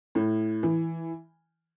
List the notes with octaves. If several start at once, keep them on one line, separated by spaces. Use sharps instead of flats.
A2
E3